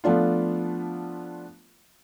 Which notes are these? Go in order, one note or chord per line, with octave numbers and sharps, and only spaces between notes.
F3 A3 B3 D4 F4